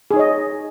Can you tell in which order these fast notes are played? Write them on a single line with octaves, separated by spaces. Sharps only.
G#4 D#4 C#5 D#5